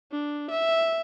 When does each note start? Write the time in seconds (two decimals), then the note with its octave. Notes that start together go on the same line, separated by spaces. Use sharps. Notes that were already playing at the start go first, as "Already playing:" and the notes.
0.12 D4
0.50 E5